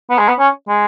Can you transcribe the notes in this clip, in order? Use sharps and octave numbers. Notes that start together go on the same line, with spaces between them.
B3
G#3
B3
C#4
G#3